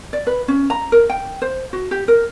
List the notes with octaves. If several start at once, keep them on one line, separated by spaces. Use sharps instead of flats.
D5
B4
C#4
A#5
A#4
G5
C5
F#4
G4
A#4